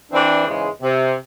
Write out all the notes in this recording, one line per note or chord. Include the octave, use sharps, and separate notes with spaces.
E3 C4 D4
G#2 C#3 E3 G#3
C3